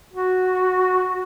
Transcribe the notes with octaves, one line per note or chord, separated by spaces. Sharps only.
F#4